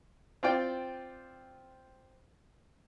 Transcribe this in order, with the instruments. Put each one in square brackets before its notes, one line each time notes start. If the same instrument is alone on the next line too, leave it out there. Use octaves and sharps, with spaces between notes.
[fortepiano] C4 F4 D5 G5